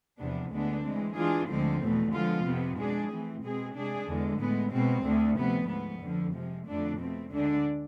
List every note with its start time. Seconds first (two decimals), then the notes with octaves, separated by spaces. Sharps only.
0.19 E2 C3 F3 B3 D4
0.52 D2 D3 G#3 B3 D4
0.84 E3 G#3 C4
1.16 E3 G#3 D4 F4 G#4
1.48 D2 D3 F3 G#3 C4
1.81 E2 B2 A3
2.13 D3 F3 G#3 B3 F4
2.45 F2 C3 F3 B3
2.78 B2 G#3 D4 G#4
3.10 E3 A3 C4
3.43 B2 G#3 C4 G#4
3.76 C3 G#3 D4 G#4
4.07 E2 D3 G#3
4.39 A2 G#3 B3
4.73 B2 G#3 C4
5.04 D2 D3 A3
5.37 D2 C3 F3 B3
5.69 G#2 F3 B3
6.02 F2 D3 F3
6.34 C3 F3 G#3
6.67 F2 D3 A3 D4
6.98 B2 A3 C4
7.31 D2 D3 G#3 D4